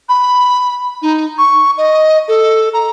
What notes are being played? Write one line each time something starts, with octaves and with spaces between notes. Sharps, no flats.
B5
D#4
C#6
D#5
A4
A#5